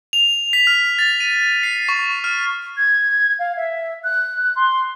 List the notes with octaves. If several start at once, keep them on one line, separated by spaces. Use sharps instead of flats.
F7
B6
F6
A6
D#7
C7
C#6
F6
G#6
F5
E5
F#6
C6